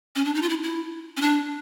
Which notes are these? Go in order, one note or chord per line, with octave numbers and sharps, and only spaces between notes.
C#4
D4
D#4
F4
E4
E4
C#4
D4